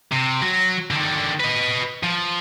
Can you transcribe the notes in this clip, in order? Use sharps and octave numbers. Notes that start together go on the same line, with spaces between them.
C3
F#3
D3 D#3
B4 D#5
F3